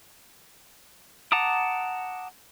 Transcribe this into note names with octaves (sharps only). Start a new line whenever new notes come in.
F#5 A5 A#5 D6 D#6